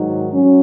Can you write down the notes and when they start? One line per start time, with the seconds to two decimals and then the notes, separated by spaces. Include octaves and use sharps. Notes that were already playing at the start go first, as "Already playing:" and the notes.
Already playing: G#2 D#3 F#3
0.31 F#3 C#4